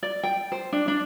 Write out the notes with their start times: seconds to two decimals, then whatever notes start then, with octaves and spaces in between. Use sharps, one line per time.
0.03 D5
0.23 G5
0.52 C5
0.73 D4
0.88 D4